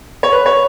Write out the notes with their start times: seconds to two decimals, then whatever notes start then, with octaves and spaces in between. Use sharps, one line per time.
0.23 C#5
0.32 B4
0.46 C#5